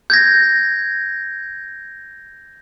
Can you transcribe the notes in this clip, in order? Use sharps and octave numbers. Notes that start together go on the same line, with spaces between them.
G6 G#6 A#6